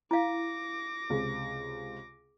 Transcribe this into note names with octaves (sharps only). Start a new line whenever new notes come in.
E4 F5 D6 A#6
C#2 C3